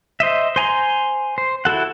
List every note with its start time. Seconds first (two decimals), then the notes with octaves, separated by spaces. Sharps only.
0.20 C5 D#5 E5
0.56 C5 G#5 A#5 C6
1.38 C5
1.65 E4 F#4 A4 F#5